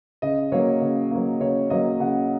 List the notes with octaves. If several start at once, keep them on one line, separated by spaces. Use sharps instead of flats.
C#3 D#5
F#3 A#3 C#5
C#3
F#3 A#3
C#3 C#5
F#3 A#3 D#5
C#3 F#5